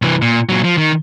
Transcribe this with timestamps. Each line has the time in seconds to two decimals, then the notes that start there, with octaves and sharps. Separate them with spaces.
0.02 C2 E3
0.22 A#2
0.49 A#2 F#3
0.64 F3
0.78 D#3